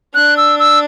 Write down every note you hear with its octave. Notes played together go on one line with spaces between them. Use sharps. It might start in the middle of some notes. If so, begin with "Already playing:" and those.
D4 F#6
E6
E6